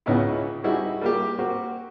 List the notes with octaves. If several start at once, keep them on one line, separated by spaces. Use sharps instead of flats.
C#2 C#3 B3 C#4 D#4 E4
G3 C4 D#4 E4 F#4 G#4
G3 A#3 G4
A#3 C4 F#4 G4